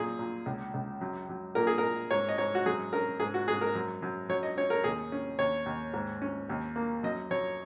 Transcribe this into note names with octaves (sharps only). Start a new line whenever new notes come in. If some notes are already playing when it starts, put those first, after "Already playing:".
Already playing: F#2 A#2 G#4
A#2
C#2
C#2
F#2
F#2
A#2 A#4
G#4
A#4
A#2
G#2 C#5
D#5
G#2 C#5
F#4
F#2 G#4
C#4 A#4
G#2 G#4
F#4
G#2 G#4
A#4
F#2
F#2
F#2 C#5
D#5
C#4 C#5
A#4
D#2 G#4
C#4
D#2 C#5
D#2
G#2
C#4
D#2
A#3
F#2 D#5
F#2 C#5